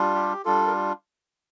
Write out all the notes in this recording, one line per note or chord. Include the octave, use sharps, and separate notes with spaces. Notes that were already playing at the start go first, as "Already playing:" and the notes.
Already playing: G3 D4 F4
G4
G3 D4 F4 A4
A#4